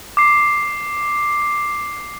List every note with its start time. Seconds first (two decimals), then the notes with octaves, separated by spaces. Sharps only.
0.17 D6 C7